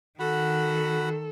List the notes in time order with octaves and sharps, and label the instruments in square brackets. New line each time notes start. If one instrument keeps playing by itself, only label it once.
[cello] D#3 [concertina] F#4 F#5 B5 [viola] A4